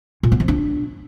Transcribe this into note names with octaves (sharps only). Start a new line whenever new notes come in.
A#2
B3
F3
D4